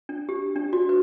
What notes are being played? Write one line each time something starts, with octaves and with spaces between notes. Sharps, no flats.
D4
G4
D4
F#4
B4